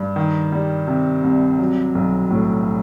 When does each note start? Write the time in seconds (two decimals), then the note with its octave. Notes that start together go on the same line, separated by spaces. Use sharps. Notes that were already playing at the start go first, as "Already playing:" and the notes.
Already playing: G2
0.16 D#3
0.52 G3
0.88 C3
1.24 C2
1.59 F#3
1.95 B1
2.30 A2